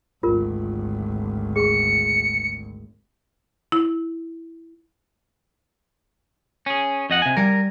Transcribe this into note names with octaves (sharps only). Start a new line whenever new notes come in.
G#1 D2 F4 A#4
G#4 C#6 C#7
E4
C#4 G#4
F2 D#5 F#5
C3 G#5
G3 A#4 G#5